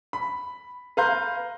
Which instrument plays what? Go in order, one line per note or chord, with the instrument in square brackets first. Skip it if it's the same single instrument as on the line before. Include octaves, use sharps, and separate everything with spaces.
[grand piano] B5
B4 F5 A#5 C6 G6